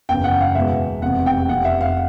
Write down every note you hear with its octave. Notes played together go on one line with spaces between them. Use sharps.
F#1 E2 C#3 G5
F#5
F5
E2 B2 G#3 E5
F1 E2 C3 F#5
G5
F1 F2 C3 F#5
E5
F5